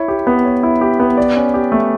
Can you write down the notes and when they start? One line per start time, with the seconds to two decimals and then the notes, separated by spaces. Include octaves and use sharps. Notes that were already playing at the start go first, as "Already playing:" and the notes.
Already playing: E4 C#5
0.08 G4
0.27 B3
0.45 C#5
0.63 E4
0.81 G4
1.00 B3
1.17 D5
1.36 C#4
1.54 G4
1.72 A3